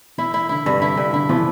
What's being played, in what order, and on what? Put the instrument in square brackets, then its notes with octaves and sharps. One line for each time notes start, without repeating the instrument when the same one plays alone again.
[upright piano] E3 [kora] E4
[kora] E4
[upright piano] D3 [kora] E4
[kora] G2 [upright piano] C3
[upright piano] D3 [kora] E4
[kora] G2
[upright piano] D3 [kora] E4
[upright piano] E3 [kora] F3